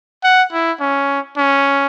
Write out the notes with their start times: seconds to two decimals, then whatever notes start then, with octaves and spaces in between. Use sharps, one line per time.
0.24 F#5
0.52 E4
0.80 C#4
1.37 C#4